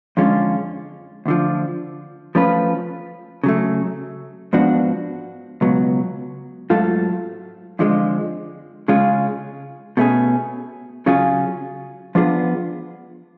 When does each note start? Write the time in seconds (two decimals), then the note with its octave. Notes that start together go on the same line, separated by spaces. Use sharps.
0.17 F2 D3 G#3 C#4 F4
1.26 D2 D3 F3
2.35 F3 A3 C#4 F4 B4
3.43 C#3 F#3 A3
4.53 G#2 F3 B3 D4 F#4
5.61 C#2 B2 F#3 B3
6.70 G#2 F#3 A3 F4 A4
7.79 F2 D3 F3 G#3
8.88 C#3 G#3 C#4 F4 G#4
9.97 B2 A3 C#4 G#4
11.06 C#3 F#3 C#4 F4 G#4
12.15 F3 B3 D4 F4 G#4